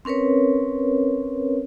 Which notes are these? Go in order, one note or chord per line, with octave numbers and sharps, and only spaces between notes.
C4 C#4 A#4 B4 C#5